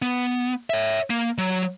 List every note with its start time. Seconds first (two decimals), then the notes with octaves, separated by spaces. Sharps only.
0.02 B3
0.70 C#5 E5
1.10 A#3
1.38 F#3